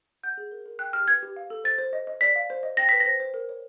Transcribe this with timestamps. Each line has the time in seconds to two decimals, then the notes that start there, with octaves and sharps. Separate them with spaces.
0.23 F#5 G6
0.37 G#4
0.51 A#4
0.66 A#4
0.79 G5 F#6
0.93 G4 F6
1.08 B4 G#6
1.23 G4
1.36 F5
1.50 A4
1.64 C5 A6
1.78 C5
1.93 D#5
2.07 D#5
2.21 D5 B6
2.36 F5
2.50 C5
2.63 D#5
2.77 G5 A#6
2.89 B4 B6
3.00 A#6
3.06 C5
3.20 C5
3.34 A#4
3.49 C#5